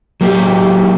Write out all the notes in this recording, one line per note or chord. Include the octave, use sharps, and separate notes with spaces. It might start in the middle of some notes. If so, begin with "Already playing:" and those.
F#3 A#3 G4